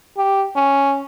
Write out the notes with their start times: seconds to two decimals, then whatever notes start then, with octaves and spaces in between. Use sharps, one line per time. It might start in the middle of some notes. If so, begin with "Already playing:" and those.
0.18 G4
0.56 C#4